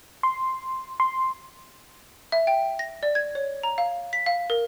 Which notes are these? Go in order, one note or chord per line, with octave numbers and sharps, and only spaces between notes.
C6
C6
E5
G5
A#6
D5
G#6
C#5
A#5
F5
B6
F5
A#4